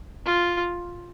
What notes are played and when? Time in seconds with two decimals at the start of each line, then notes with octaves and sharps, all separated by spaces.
0.25 F4